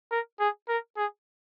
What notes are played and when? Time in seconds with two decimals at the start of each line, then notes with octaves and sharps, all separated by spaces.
0.11 A#4
0.40 G#4
0.69 A#4
0.97 G#4